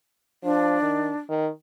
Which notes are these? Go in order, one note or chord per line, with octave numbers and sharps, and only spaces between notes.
F3 D4
D#3
D#3